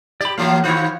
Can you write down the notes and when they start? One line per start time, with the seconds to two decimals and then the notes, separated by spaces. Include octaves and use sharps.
0.21 G4 D5 B5
0.38 A2 E3 F#3 A#3 F5
0.64 D#3 F4 F#4 C5 C#5